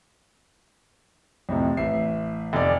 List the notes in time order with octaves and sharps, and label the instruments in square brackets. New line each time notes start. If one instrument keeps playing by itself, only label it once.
[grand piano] F2 A2 C3
A1 E5 C7
[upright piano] F1 D5